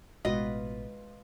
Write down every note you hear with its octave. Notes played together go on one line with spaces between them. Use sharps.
A1 B2 G#3 F4 F#4 B4 D#5